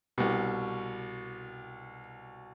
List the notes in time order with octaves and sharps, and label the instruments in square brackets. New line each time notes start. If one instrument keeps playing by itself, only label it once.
[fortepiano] C2 B2 G4